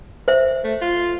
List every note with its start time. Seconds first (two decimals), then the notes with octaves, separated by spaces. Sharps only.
0.28 C5 E5
0.64 A3
0.82 F4